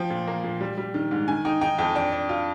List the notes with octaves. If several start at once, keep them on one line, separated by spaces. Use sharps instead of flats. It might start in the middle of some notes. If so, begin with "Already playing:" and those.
Already playing: F3 G5
A#2
A#3
A#2
G3
G3
D#3
G#2
D#3 G#5
D#4 G5
D#4 G5
F2 G5
D4 G5
D4
F4